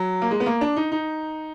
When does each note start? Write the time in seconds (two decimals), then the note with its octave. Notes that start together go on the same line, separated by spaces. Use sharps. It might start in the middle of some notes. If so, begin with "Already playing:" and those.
Already playing: F#3
0.22 A#3
0.31 G#3
0.40 B3
0.46 A#3
0.61 D4
0.76 D#4
0.92 D#4